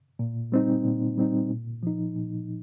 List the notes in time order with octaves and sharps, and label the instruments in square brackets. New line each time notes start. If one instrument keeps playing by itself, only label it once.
[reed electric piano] A#2
G3 C4 D#4
A#2
G3 C4 D#4
A#2
F3 D#4
A#2